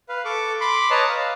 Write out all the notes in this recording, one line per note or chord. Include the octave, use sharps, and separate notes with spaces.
B4 F5
A4 C#6 D6
B5 C6 D6
B4 C#5 D#5 A5 A#5
F5